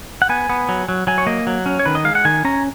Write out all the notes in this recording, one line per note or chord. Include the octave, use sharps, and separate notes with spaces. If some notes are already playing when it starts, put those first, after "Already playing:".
F#5
B3 G#5
B3
F#3
F#3
F#3 G#5
C#5
A#3 D#5
F#3
C#4
C#5
D#3 B4
D#5
G#3 F5
F#5
D#3 G#5
C#4 A#5